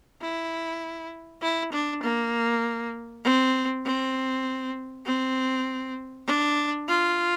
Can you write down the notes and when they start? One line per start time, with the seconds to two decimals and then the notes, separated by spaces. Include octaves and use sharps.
0.21 E4
1.42 E4
1.72 D4
2.03 A#3
3.24 C4
3.85 C4
5.06 C4
6.27 D4
6.88 F4